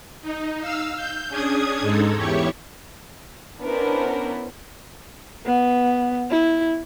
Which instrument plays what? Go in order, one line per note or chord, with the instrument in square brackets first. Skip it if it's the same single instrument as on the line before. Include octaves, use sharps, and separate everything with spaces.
[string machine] D#4
F5 E6
G6
C#4 D4 G#4 D#6 G#6
G#2 G#3 D#4 A4
E2 E4 G4 C#5 C#6
[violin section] B3 C#4 D4 E4 A#4 C5
[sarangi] B3
E4